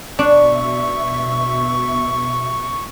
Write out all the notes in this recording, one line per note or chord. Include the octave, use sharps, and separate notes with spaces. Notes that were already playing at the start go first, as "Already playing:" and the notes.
B2 D4 E5 C#6